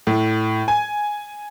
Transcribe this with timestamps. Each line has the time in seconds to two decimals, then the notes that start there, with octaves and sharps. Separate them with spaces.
0.07 A2
0.68 G#5